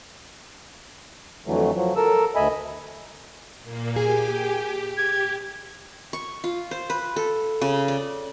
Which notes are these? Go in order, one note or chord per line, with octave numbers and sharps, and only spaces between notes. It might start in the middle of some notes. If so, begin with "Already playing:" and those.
F2 D3 E3 F#3 A3
F3 F#3
A4 A#4 E6
D2 D#5 E5 G#5 B5
A#2 A#3
G4 G#4 G#5
G4 G#6
C#6
F4
C5
B4
A4
C#3
D5